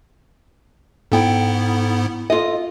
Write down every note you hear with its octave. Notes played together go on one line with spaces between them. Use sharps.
G#2 B3 E4 A4 G5
F4 A4 D#5